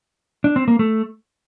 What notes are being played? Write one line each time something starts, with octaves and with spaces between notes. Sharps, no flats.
D4
C4
A#3
A3